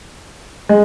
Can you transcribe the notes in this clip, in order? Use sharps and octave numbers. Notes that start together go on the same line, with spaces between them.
G#3